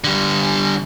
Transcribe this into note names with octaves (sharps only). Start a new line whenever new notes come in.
D3 G3